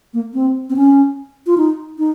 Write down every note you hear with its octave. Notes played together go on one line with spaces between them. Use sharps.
A#3
C4
C4
C#4
F4
D#4
D#4